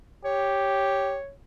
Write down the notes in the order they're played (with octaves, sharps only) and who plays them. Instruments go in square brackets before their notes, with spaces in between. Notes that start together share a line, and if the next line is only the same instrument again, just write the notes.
[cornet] G4 [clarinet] C#5